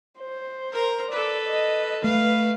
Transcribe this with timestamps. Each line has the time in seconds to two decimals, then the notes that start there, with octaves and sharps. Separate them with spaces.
0.19 C5
0.72 A#4 A#5
1.11 A4 B4 D5
1.48 D#5
2.04 A3 B4 F5